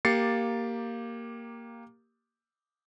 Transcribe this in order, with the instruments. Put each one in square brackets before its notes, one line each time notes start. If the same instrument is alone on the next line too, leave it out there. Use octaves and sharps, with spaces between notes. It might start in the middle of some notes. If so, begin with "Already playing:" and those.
[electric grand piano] A#3 G4 A6 C7 C#7